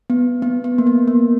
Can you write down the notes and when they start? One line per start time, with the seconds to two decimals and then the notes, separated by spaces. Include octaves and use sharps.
0.10 B3
0.42 B3
0.64 B3
0.78 A#3
0.87 B3
1.08 A#3